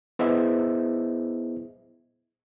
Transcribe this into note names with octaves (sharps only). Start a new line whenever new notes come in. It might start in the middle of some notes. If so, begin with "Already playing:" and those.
B3 E4 G#4 C5 D#5 E5